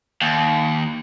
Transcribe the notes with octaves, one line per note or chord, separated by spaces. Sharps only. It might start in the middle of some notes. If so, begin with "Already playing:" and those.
D#2